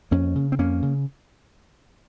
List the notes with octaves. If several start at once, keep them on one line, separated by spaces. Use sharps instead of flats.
F2 A#3 C#4
C#3
C4
F2 A#3 C#4
C#3